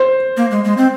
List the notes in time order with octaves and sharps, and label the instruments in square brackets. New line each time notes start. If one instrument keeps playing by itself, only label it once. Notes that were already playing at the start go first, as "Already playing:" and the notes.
Already playing: [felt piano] C5
[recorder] A#3
G#3
G#3
C4